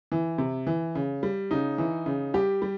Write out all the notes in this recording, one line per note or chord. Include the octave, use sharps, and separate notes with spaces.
E3
C3
E3
C#3
G3
C#3 D#4
E3
C#3
G3 G4
G3